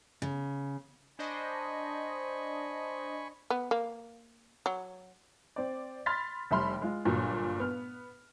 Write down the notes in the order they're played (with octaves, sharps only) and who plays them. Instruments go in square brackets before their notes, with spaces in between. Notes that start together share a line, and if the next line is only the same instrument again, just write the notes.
[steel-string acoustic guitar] C#3
[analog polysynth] D4 C5 D#5 [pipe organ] G#5 B5 C#6
[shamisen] B3
A#3
F#3
[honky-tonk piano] C4 D5
B5 C6 F6 A6 B6
F1 G3 E5 B5 C6 F6
G#3 F4
G1 A#2 F#3
B3 F6